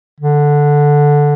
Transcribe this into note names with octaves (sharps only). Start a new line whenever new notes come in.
D3